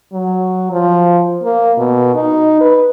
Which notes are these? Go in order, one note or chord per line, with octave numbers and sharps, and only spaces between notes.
F#3
F3
A#3
B2
D#4
B4